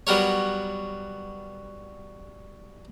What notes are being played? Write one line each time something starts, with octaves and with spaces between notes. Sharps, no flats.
F#3 G3 B3 A#4 C#5